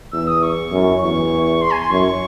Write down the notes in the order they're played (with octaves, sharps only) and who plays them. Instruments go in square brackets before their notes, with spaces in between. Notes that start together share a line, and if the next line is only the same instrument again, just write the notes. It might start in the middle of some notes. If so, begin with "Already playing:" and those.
[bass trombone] E2 [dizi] E6
[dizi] D#6
C#6
[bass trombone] F#2
[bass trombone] E2 [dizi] C#6
[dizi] C6
G#5
C6
[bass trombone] F#2 [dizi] C#6